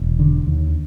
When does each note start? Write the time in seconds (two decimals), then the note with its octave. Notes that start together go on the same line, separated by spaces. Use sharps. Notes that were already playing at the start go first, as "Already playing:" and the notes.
Already playing: E1
0.19 D3
0.47 D#2